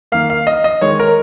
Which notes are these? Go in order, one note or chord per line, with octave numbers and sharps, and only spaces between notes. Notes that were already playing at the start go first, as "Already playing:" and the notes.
D#3 A#3 F5
F5
D#5
D#5
D#3 G#3 C#5
A#4